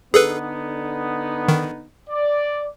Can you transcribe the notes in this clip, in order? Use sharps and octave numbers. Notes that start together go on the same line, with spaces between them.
D3 B3 D#4 G#4 A4 B4
D#3
D5